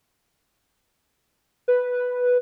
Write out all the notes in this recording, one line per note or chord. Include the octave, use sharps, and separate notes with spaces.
B4